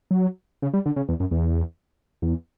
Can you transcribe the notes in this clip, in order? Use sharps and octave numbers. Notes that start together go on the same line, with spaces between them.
F#3
C#3
G3
D3
C#3
E2
F#2
E2
E2